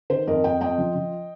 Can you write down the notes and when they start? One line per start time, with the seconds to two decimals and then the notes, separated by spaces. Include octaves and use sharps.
0.10 D#3 C5
0.27 F2 A#4 D#5
0.44 F2 D#5 G5
0.61 F2 D#5 G5
0.78 F3
0.95 F3